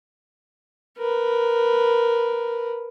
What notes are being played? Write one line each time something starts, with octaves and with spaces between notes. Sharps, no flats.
A#4 B4